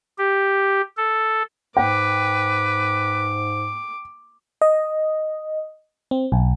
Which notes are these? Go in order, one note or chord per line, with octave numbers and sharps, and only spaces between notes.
G4
A4
G#2 B4 G5 D6
D#5
C4
B1